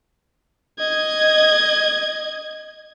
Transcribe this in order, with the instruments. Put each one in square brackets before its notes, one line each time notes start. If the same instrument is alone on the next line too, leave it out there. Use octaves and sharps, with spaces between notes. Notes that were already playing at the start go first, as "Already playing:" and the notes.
[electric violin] D#5 G#6